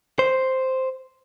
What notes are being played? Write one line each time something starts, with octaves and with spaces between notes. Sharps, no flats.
C5